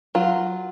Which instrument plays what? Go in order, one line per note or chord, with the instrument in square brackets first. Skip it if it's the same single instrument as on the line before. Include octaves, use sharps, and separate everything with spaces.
[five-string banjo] F#3 F4